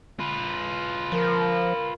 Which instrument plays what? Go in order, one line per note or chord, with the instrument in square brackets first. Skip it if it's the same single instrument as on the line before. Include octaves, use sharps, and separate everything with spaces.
[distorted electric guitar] F4 B4
[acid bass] F3 [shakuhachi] A#4